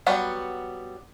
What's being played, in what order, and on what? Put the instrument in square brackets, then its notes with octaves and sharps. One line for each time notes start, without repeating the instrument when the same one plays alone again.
[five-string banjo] F#3 G3 B3 F#4